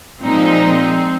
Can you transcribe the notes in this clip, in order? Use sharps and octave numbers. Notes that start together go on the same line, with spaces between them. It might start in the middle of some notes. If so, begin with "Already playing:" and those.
A#2 F3 G#3 C4 D#4
C4